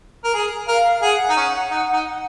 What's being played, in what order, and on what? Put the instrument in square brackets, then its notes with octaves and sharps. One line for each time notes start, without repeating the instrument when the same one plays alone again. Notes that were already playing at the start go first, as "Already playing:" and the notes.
[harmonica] A#4
G#4
[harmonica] A#4 [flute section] F5
[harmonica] G#4 [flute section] F#5
[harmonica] D#4
C#4
D#4
D#4